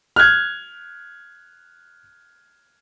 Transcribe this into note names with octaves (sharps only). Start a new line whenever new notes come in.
F6 F#6 G#6